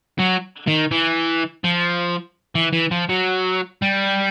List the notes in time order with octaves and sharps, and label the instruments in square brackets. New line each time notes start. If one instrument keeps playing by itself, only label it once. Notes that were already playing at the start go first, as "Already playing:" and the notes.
[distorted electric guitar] F#3
D#3
E3
F3
E3
E3
F3
F#3
G3